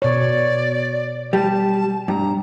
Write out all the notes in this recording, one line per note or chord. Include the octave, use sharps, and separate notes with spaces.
B2 C#5 D5
G3 A5
G2 A#5